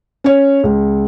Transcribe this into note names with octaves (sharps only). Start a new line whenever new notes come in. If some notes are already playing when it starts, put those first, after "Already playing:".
C#4 C#5
C#2